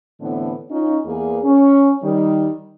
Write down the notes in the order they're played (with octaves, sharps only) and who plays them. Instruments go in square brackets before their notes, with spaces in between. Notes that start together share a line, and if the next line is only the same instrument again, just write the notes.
[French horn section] A2 D3 E3 A3 B3 C4
C#4 D#4 F4
E2 A#3 G#4
C#4
D#3 G3